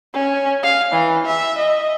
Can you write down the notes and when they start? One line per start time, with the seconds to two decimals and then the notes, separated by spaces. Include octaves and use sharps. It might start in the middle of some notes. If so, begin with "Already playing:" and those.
0.14 C#4
0.63 F5
0.93 E3
1.26 E5
1.58 D#5